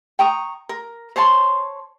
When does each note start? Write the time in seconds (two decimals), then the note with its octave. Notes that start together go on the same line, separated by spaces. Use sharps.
0.19 G5 A#5 C#6 D#6
0.69 A#4
1.16 C5 C#5 A5 C6